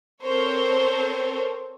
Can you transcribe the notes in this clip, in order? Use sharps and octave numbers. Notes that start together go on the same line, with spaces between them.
C4 A4 A#4 C5 C#5